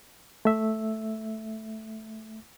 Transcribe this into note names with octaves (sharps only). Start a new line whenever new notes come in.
A3 E5